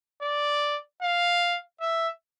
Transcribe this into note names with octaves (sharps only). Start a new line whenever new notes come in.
D5
F5
E5